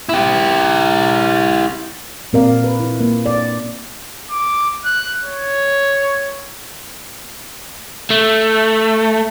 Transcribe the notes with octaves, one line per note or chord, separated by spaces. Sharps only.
E4 G4
A#2 C4 A#4 D5 F5
B4
E4
A#3
D5
D6
F#6
C#5
A3